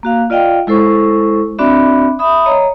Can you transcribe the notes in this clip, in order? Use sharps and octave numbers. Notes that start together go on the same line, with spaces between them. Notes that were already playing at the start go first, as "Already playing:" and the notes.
A#3 F#4 F5
F4 D5 D#5 F5 G5
G#3 E4 A4 C5 C#6
C4 D4 F#4 D5 E5 B5
E5 B5 D#6
C#5 D#5 A#5